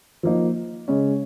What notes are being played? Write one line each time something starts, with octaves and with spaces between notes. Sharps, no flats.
F3 A#3 D#4
C#3 G#3 C#4